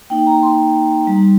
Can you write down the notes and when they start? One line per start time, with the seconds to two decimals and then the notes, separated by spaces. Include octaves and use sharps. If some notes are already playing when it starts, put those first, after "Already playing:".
0.10 A#3 D#4 G5
0.27 A#5
0.43 C6
1.07 G3 D#4